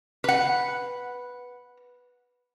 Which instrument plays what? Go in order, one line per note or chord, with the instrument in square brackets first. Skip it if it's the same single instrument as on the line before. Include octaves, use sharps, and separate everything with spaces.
[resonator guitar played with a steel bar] B4 F#5